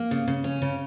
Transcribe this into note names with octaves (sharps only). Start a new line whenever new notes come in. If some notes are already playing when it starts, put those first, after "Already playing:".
Already playing: A#3
C#3
C#3
C#4
C#3